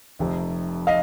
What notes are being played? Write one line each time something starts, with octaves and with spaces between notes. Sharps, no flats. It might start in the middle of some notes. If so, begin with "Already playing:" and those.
F1 F2 C3
D#5 F5